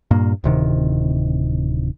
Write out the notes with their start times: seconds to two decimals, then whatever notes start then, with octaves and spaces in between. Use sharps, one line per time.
0.11 G2 A#2 A#3
0.44 D1 C3 D#3